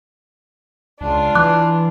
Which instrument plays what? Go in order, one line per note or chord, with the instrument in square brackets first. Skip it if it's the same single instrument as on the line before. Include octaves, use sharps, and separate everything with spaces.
[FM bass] C#2 [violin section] D4 F4
[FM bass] E3 [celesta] D6 F#6